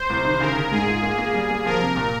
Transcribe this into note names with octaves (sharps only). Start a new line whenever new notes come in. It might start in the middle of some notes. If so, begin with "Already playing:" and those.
Already playing: C5
C2
D#3
C#3 A#4
C#3
G#2 G#4
F4
A#3
A#3
G3
A#3
F3 A#4
C3
A#2